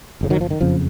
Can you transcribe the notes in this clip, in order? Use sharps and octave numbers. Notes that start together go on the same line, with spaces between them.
F#1 F2 C#3
D#3 F#3
F3
D#3
F#1 F2 C#3 F3